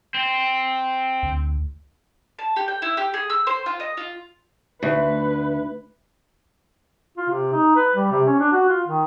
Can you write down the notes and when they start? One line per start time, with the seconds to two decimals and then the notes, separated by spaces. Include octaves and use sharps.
0.14 C4
1.23 D2
2.39 A5
2.56 G4
2.68 G5
2.82 E4
2.97 G4
3.14 G#4
3.30 E6
3.47 C5
3.66 F4
3.80 D#5
3.97 F4
4.83 D2 B4
7.18 F4
7.30 C3
7.53 D#4
7.76 B4
7.96 G3
8.11 C3
8.27 C#4
8.40 D4
8.52 F#4
8.69 F4
8.87 D#3